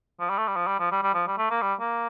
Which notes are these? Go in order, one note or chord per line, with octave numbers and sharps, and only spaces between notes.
F3
G3
A3
G3
F3
G3
F3
G3
G3
F3
G3
A3
A#3
G3
A#3